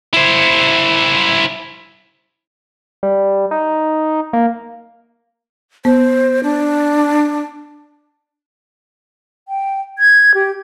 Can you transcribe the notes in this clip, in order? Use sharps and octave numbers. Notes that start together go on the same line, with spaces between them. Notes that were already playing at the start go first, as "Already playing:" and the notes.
E4 C5
G3
D#4
A#3
B3 C5
D4
G5
G#6
G4